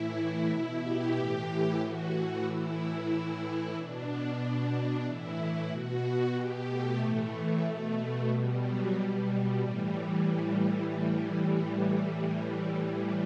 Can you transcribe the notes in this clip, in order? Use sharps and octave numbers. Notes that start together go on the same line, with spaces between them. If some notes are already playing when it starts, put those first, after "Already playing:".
Already playing: A2 E3 E4
B2 E4
G4
A2 E3
A2 E3 F#4
F#4
A2 E3 E4
A2 E3
B2 D4
B2
A2 E3 E4
E4
B2 F#4
B2 G4
A3
A2 E3
B2
B2 G3
F#3
B2 G3
A2 E3 G3